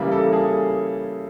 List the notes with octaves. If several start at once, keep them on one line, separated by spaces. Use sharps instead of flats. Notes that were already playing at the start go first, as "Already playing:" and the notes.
Already playing: C#3 E3 G3 A#3
A4
G#4